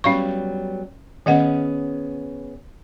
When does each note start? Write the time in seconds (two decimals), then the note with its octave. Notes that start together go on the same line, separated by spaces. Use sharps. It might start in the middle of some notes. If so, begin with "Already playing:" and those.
0.04 F#3 G3 B3 C#4 F5 C#6
1.26 D#3 B3 C#4 G#4 D#5 F#5